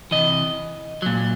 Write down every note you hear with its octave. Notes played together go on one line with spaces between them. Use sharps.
C3 E3 D#5
A#2 F#3